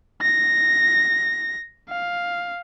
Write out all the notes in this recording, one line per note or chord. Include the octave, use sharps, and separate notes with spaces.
A#6
F5